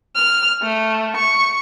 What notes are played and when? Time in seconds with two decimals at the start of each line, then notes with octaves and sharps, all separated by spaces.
0.16 F6
0.63 A3
1.17 C#6